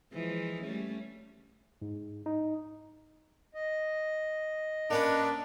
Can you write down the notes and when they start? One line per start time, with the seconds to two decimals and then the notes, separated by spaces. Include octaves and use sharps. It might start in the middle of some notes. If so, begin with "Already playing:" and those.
0.13 E3 F3 G#3
0.63 G3 A3 C#4
1.82 G#2
2.26 D#4
3.54 D#5
4.90 A#3 C#4 D4 B4